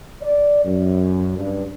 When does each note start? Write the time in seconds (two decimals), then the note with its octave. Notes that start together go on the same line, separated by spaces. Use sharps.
0.21 D5
0.65 F#2
1.38 G2